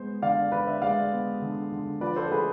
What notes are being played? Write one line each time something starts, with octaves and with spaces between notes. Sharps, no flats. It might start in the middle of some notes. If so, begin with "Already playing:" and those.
Already playing: G#3 B3 C5
D3 D5 F5
D3 B4 D5
C5 E5
G#3 D5 F5
B3
D3
D3
F3 B4 D5
A4 C5
A3 G#4 B4